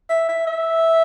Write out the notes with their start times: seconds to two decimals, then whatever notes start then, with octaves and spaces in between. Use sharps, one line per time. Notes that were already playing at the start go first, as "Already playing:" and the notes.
0.10 E5
0.29 E5
0.47 E5